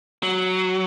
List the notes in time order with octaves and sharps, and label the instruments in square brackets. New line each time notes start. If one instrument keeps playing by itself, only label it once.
[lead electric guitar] F#3